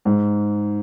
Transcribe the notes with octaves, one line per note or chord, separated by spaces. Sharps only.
G#2